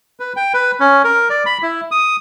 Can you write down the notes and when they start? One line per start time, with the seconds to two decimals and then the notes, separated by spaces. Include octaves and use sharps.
0.20 B4
0.36 G5
0.54 B4
0.80 C#4
1.04 A#4
1.30 D5
1.46 B5
1.63 E4
1.91 D#6